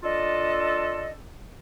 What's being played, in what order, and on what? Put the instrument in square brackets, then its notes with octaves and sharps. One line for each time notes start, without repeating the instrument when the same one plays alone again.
[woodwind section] D4 F4 A4 D#5